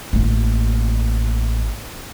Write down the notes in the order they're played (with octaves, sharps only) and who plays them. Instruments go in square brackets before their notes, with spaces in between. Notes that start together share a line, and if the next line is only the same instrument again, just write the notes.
[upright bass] A1 A#3